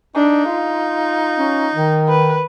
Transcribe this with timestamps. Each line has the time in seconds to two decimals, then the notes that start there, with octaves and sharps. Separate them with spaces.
0.15 D4 D#4
0.49 F4
1.38 C#4
1.75 D#3
2.09 B4